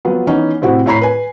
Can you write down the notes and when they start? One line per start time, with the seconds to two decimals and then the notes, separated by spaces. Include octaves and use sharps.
0.05 F3 F#3 B3 F4
0.27 E3 B3 C#4 D#4
0.62 A2 C3 C4 E4 F#4
0.86 A2 E4 C#5 A#5 B5 C7
1.01 B4 G#5